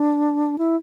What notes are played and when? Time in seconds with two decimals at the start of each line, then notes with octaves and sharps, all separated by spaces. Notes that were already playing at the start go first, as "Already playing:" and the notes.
Already playing: D4
0.58 E4